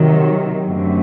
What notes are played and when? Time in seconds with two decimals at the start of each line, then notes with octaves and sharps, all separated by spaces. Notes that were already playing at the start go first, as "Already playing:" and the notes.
Already playing: C3 D#3 F#3
0.66 F#2 D3 F#3 A3 C4